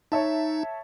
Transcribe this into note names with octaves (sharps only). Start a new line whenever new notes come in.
D#4 C#5 E5 A5